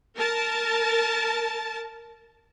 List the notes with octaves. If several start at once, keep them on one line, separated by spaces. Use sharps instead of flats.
A#4 A5